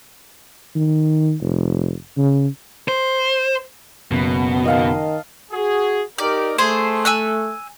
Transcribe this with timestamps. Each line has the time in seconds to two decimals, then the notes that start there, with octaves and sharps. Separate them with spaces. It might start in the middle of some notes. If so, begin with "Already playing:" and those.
0.76 D#3
1.41 F1
2.17 C#3
2.88 C5
4.11 F#1 B2
4.65 D#3 D#5 F5 A5
5.51 F#4 G#4
6.18 D#4 G4 A#4 D5
6.58 A3 G#4 C5 C6
7.05 G#5 E6 F#6